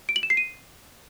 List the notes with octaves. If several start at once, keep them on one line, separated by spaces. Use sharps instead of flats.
D7
F#7
E7
C7
D#7